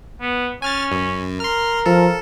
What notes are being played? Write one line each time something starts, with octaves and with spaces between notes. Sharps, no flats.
B3
C#4 G#5 F6 A6
F#2
A#4 C6 F6
F3 A4